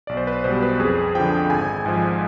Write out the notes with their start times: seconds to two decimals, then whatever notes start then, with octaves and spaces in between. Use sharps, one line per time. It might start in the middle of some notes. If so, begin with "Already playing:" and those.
0.07 B1 D5
0.17 C5
0.27 B4
0.44 B2 G3 C5
0.62 B4
0.75 B4
0.79 F2 G#4
1.15 D3 F3 G5
1.50 G#1 G#5
1.85 G#2 F3 G#5